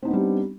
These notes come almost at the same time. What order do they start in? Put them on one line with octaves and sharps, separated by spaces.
C4 D#4 B3 D4 G3